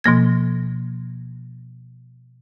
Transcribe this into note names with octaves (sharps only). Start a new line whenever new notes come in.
B2 F3 A#3 G#6